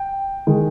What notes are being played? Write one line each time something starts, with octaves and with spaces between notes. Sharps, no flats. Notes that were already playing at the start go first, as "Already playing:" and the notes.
Already playing: G5
D#3 G#3